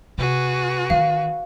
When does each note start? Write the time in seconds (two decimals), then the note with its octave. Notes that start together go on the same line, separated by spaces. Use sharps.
0.18 C3 F#4 G#4 B4
0.90 D#3 E3 F5